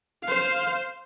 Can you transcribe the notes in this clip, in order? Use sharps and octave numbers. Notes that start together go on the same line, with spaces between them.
C5 F5